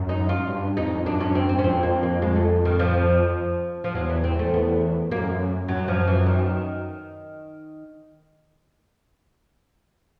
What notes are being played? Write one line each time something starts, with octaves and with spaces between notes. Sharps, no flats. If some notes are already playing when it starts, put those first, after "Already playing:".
Already playing: F#2
D#4
F4
G2
F2 D#4
F#2 D4
C#4
C4
C4
C#4
F2 C4
A#3
A#3
G#3
A3
D#3
F3
F3
E2 F#3
B3
C4
A3
E2 B3
F#2 A#3
F#2 F#3
F3
E3
D#3